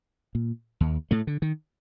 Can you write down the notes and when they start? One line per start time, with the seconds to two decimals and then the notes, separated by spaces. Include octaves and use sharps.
0.35 A#2
0.81 D#2
1.11 A2 A3
1.27 D3
1.42 D#3